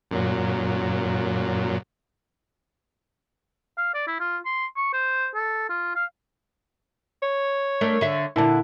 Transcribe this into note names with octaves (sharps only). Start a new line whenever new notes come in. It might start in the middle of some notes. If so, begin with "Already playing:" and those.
F#2 A#2 F#3
F5
D5
E4
F4
C6
C#6
C5
A4
F4
F5
C#5
A3 D4 A#4
D3 E5
A#2 D3 E4 A5